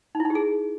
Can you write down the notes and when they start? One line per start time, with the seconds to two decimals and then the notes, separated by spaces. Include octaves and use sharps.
0.15 D#4
0.20 E4
0.25 D#4
0.30 G4
0.35 G#4